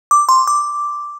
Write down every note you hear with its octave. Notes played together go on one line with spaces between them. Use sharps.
D6
C6
D6